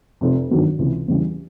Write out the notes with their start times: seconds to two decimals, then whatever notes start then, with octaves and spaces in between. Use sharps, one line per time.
0.21 F1 F2 C3
0.50 G#1 G2 D#3 F#3 B3
0.79 C#2 C3 E3
1.08 E2 C#3 E3 G3